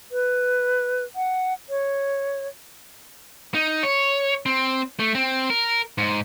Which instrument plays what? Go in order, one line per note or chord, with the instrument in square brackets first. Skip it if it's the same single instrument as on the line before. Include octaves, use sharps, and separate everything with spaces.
[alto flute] B4
F#5
C#5
[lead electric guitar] D#4
C#5
C4
A3
C4
A#4
G#2